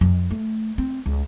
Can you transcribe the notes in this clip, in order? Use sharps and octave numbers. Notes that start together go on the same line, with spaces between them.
F2
A3
C4
C#2